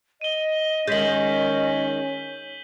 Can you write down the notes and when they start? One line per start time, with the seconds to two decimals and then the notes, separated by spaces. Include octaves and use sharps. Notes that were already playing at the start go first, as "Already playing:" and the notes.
0.21 D#5 D#7 G7
0.87 D#3 G#3 C#4 G6 B6 F#7